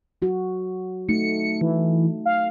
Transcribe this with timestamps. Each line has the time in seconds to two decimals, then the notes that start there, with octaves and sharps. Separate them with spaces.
0.22 F#3 F#4
1.09 A3 D#4 C#7
1.61 E3
2.26 F5